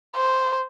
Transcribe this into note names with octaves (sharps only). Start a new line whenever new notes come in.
C5